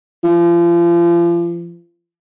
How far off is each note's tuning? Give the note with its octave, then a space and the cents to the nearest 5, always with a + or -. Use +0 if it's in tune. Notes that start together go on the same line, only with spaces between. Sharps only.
F3 -35